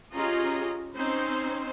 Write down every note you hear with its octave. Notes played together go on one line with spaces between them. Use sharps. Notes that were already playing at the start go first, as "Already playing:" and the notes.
C#4 F4 G4 G#4 D#5 A#5
C4 C#4 D#4 C5